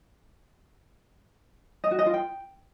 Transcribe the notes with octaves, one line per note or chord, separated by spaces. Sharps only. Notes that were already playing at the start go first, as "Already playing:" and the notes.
D#5
F#4
D#5
F4
G5